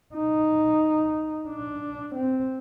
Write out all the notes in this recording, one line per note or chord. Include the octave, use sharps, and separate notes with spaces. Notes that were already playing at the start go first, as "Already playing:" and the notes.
D#4
D4
C4